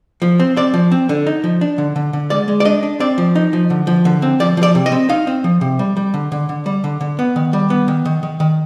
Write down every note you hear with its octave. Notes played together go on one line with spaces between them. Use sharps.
F3
C4
C4 D5
F3
C4
D3
D#4
F3
D4
D3
D3
D3
G#3 D5
G#3
D5
D4 D#5
D4
C4 D5
F3
D#4
F3
D3
F3
D3
C4
F3 D5
F3
D5
C3
D#5
C4
D#4 F5
C4
F3
C3
G3
G3
D3
D3
D3
G3
D3
D3
B3
D#3
G3
B3
D#3
D#3
D#3
D#3